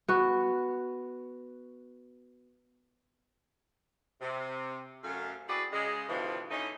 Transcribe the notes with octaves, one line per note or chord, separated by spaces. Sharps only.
B3 F#4
C3
F#2 A3 F5
C4 E4 F#4 G#4 B4 D5
C#3 G#3
G2 B2 D3 E3 F3
A2 D3 A3 C#4 D#4